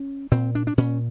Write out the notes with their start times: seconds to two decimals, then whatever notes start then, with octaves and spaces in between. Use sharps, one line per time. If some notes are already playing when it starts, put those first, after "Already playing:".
Already playing: C#4
0.31 A#2 C4
0.55 D4
0.67 D4
0.78 A#2 C#4